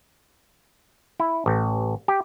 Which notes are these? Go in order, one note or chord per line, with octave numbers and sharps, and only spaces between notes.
E4
A1
G4